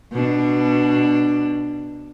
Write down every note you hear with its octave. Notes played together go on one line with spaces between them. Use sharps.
B2 D4